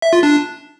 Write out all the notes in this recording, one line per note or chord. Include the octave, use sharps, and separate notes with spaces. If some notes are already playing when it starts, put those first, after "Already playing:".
E5
F4
D4